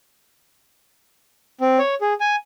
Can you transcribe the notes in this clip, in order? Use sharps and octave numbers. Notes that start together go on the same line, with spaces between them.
C4
C#5
G#4
G#5